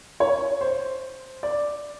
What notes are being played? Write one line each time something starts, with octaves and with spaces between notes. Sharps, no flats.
C#5
C5
D5